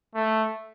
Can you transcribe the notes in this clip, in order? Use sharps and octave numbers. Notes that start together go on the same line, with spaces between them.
A3